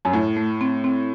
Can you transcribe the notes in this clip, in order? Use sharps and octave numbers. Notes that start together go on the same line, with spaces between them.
F#2
A2 A3
A3
C4
C4